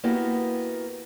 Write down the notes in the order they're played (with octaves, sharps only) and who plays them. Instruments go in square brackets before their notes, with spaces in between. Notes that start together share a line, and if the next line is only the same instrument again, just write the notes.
[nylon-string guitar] A#3 B3 E4 F#4 G4